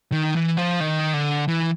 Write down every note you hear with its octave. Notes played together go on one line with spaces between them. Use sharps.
D#3
E3
F3
D#3
D3
E3